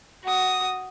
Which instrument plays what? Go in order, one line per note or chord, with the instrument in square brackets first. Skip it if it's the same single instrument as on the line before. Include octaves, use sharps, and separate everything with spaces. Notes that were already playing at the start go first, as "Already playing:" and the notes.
[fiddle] F#4 D#6